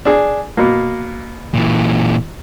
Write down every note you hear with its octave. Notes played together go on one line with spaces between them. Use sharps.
D4 G#4
B2 A#3
A#2 E3